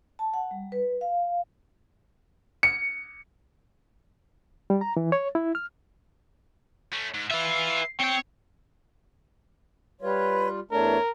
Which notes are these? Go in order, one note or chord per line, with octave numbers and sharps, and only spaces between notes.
A5
F#5
G3
B4
F5
C#7
G3
A#5
E3
C#5
E4
F6
A3 C#4
G#2
F4 B4 E5
C4 C#5 G5
G3 F4 B4 C#5
E2 A3 D4 A#4 C#5